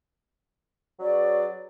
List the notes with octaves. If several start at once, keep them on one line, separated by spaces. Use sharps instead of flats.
F#3 C#4 G#4 B4 D5